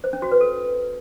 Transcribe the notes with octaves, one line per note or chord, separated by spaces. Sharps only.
C5
C#4
F#4
B4
A4